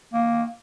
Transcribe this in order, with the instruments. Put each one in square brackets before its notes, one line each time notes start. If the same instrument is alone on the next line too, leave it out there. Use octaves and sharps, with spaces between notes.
[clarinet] A#3